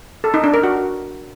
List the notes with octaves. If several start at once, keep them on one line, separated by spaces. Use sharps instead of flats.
A4
D#4
D4
A#4
F#4